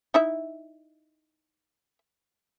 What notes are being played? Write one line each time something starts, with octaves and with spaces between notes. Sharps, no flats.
D#4 E4 E5